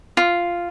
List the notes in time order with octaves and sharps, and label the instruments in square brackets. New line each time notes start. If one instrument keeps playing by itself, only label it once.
[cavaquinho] F4